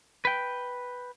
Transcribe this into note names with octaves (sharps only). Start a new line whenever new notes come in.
B4 G5